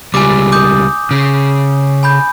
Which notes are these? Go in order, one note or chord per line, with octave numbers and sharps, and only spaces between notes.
C#2 G3 G#5 D6
D6 D#6 G6
C#3
G#5 B5 G6